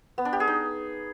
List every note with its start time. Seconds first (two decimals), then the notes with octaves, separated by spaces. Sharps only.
0.18 B3
0.25 D4
0.33 G4
0.40 G#4
0.47 D#4